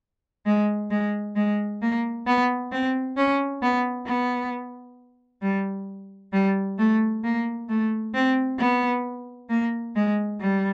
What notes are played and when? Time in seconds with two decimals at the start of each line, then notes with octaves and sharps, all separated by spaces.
0.46 G#3
0.90 G#3
1.36 G#3
1.82 A#3
2.27 B3
2.72 C4
3.17 C#4
3.62 B3
4.07 B3
5.42 G3
6.33 G3
6.79 A3
7.24 A#3
7.69 A3
8.14 C4
8.59 B3
9.50 A#3
9.96 G#3
10.41 G3